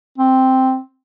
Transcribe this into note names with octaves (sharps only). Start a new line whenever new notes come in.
C4